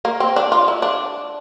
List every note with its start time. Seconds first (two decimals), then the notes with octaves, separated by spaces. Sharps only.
0.05 A#3
0.20 C4
0.36 D4
0.52 F4
0.68 E4
0.82 D4